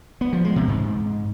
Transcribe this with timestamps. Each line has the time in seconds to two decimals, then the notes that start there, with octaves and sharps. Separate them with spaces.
0.21 B3
0.33 F3
0.44 G#3
0.56 C3
0.68 G#2